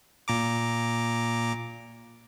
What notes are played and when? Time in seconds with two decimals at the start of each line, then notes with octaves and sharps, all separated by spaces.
0.28 A#2 A#5 D6